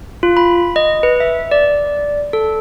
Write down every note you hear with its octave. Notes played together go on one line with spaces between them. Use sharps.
F4
B5
D#5
B4
E5
D5
A4